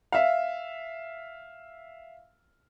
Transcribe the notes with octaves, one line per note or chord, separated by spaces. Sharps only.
E5 F5